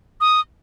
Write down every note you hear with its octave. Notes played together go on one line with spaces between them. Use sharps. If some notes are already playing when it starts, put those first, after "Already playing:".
D#6